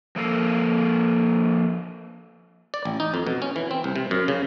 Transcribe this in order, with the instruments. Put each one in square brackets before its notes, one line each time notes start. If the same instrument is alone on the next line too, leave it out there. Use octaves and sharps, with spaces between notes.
[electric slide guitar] F3 A#3 A4 A#4 F5
[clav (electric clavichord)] D5
A1
D#4
F2
B2
C#4
E3
C4
C2
C3
F#2
C#3